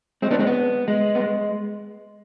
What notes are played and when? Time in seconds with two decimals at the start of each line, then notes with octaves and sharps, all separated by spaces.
0.22 G#3 C4
0.31 B3 D4
0.39 G#3 C4
0.47 B3
0.88 G#3
1.15 B3
1.20 G#3